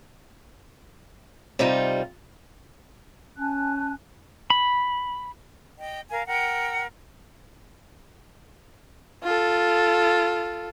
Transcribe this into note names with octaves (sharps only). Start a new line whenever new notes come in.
C3 G3 D#4 F4
C#4 G#5 A5 F#6
B5
D#5 G5
A#4 F5 G#5
A#4 F#5 G5
F4 A4